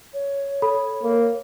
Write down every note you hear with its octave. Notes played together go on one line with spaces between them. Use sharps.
C#5
A4 B5
A#3